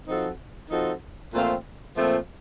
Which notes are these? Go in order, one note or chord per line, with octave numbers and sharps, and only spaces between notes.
F3 C4 D#4 F#4 A4
F3 C4 D#4 F#4 A4
A#2 F3 A3 C4 F4
A#2 F3 A3 C4 F4